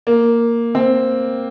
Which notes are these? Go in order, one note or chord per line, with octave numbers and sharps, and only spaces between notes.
A#3
C4